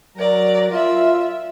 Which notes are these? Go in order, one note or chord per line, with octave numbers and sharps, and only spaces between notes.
F#3 A#4 D5
F4 E5